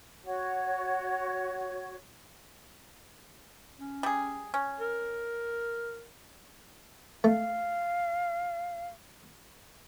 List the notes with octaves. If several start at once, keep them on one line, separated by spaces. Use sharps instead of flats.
F#4 C#5
C#4
G3 G#4
C#4
A#4
A3 F5